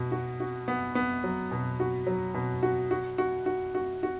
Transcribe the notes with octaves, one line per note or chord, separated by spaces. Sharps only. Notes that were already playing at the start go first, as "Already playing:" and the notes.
Already playing: B2
F#4
F#4
B3
B3
F#3
B2
F#4
F#3
B2
F#4
F#4
F#4
F#4
F#4
F#4